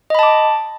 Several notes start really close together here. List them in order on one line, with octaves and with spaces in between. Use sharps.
D#5 B5 A5 D6